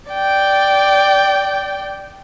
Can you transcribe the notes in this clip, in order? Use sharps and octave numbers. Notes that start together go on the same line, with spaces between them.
D5 G5